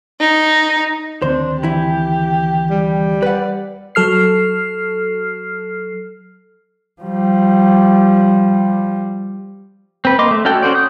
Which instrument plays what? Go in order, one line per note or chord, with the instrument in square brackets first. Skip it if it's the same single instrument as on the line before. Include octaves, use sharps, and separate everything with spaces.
[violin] D#4
[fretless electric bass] D2 D#3 C4 [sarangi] D4 [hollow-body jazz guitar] C5
[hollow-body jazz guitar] E3 E4 [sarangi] G4
[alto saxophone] G3
[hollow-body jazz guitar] B4 F#5 [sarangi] D5
[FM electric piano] F#3 A4 F6 C7
[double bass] F3 G3
[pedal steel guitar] C4 B4
A#3 D#5 C6 D6
A3
C#4 F#4 A4 G5
C#4 F#4 C5 D5
D#6 G6